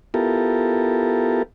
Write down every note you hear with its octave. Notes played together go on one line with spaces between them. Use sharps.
B3 E4 F4 G4 A4 A#4